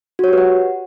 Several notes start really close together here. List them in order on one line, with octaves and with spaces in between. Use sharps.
F#4 C#5 G4 B4 F#5